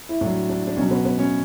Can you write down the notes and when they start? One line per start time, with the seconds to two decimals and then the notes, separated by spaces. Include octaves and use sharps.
0.09 E4
0.21 A2 F#3 D4
0.49 D4
0.67 D4
0.77 B2 F#3 C#4
0.91 B3
1.05 B3
1.19 C#4